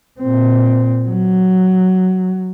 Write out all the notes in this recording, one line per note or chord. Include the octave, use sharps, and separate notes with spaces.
A#2 C4
F#3